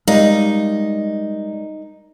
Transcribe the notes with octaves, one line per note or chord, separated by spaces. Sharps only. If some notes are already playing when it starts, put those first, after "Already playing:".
G3 G#3 D#4 A#4 D5 D#5 F5